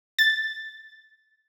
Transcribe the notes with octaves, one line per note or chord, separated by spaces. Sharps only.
A6